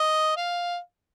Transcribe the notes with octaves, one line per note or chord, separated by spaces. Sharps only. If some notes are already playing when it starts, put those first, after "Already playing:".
Already playing: D#5
F5